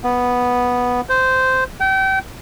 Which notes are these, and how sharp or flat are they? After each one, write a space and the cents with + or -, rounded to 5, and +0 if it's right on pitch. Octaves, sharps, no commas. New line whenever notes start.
B3 -5
C5 -10
G5 -35